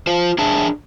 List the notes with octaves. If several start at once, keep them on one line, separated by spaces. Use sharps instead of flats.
F4 C5
D4 G#4 E5 A5